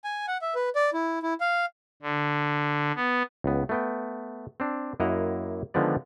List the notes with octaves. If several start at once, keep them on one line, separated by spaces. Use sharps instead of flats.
G#5
F#5
E5
B4
D5
E4
E4
F5
D3
B3
C#2 B3
A3 B3 G5
C4 D4
F#2 A#3 E4 D#5 F#5 A#5
D3 D#3 F3 G#3 B3 D5